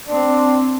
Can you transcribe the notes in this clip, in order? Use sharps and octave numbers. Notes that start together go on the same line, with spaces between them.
C4 D4